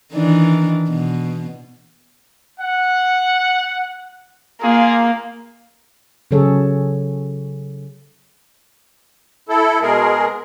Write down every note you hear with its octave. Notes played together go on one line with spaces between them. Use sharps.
D#3 E3 D4
B2
F#5
A#3 F4 G#4
C#3 F#3 G#4 A4 C#5
E4 A4
B2 G#3 G#4 A#4